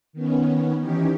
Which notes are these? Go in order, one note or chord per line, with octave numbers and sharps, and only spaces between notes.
D#3 B3 C#4
E3 C#4 D#4 G4